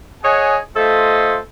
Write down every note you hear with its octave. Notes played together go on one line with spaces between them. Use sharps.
G#4 C#5 D#5 F#5 G#5
A3 F4 A4 C5 D#5